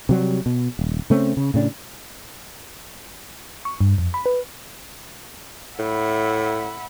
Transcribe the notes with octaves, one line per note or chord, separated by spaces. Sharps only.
C3 F#3 G3
B2
D#1
C#3 A3 C4 C#4
C#3
A2 C#3 D4
C#6
G2
F2
B5
B4
A2 E5 F#5 B5